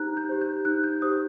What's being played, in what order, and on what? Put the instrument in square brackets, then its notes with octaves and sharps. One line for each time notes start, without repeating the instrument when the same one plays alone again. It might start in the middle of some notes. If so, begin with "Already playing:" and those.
Already playing: [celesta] D#4 G4 C5 A#5 F#6
G6
G4 C5
G6
D#4 F#6
G6
G4 C5 D#6